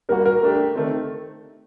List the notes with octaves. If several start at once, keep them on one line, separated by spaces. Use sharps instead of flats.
G3 A#3 F#4 A#4
A#4
A3 D4 G4
D#3 A3 C4